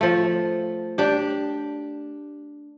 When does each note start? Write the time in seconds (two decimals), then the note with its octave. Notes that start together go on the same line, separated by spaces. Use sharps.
0.01 F3 A3
0.98 D4 G4